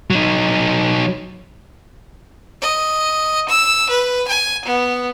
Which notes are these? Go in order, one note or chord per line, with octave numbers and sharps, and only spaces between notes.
F#3 D#4
D#5
E6
B4
G#5
B3